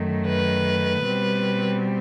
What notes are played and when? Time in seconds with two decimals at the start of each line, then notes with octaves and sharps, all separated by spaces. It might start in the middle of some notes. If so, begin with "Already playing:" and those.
Already playing: F#2 D#3 A3
0.26 B4
1.04 B2 G3 C4